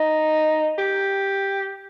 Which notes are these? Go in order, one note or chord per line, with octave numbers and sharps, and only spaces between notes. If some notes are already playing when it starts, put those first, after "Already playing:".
Already playing: D#4
G4